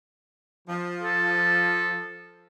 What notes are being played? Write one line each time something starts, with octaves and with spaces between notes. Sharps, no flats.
F3
A4